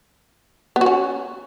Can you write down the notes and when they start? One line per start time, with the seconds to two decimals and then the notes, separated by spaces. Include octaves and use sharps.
0.76 B3
0.81 F#4
0.86 C#4